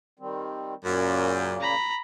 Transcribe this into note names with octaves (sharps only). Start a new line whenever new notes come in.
D#3 G3 C4
F#2 A#2 C#3 A#3
A#5 B5